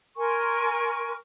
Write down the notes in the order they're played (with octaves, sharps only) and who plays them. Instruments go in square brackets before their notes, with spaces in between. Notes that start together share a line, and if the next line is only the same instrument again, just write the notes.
[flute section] A#4 G#5 C6 C#6